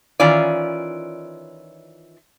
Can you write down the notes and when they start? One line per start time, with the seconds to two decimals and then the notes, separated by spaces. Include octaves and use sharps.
0.20 D#3 E3 C#4 F4 D5